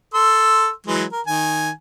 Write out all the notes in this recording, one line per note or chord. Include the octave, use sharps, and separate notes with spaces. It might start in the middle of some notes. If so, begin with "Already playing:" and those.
A4 C6 E6
E3 F#3 G#3
A#4
D#3 G#5